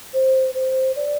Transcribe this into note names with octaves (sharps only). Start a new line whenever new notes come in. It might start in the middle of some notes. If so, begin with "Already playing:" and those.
C5
C5
D5